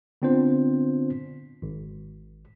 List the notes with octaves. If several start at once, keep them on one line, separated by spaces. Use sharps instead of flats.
D3 B3 C4 D4 F4 C5
G#1